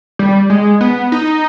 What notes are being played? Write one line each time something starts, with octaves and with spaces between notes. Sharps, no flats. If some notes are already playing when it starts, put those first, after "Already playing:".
G3
G#3
B3
D#4